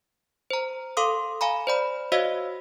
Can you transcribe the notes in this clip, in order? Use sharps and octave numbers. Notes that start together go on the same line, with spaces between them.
C5 A#5
A4 F5 C6 D6 D#6
F5 G#5 A#5 B5
C5 D5 B5
F#4 C5 C#5 D#5 F5 E6